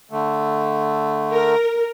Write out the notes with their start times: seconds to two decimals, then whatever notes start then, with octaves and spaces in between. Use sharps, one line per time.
0.11 D3 A3
1.31 A#4